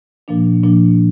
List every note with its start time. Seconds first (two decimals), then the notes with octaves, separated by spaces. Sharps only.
0.28 A#2 F3 A#3 D4
0.63 A#2 F3 A#3 D4